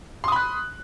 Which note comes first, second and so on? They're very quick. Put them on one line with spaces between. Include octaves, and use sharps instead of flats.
C6 D#6 B5 F#6